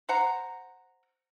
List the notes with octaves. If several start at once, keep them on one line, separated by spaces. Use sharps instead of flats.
C5 F#5 A#5